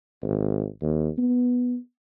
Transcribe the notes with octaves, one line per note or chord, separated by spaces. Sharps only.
G#1
D#2
B3